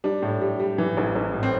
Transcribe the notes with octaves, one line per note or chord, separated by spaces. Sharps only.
G3 D4
A2
G3
G3
E3
A1
A1
A2
C4